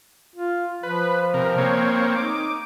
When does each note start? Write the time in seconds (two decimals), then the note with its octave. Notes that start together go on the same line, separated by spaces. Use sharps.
0.36 F4
0.83 F3 B4
1.34 C3 A#4
1.58 A#3 C4 C#5
2.16 D#4 D6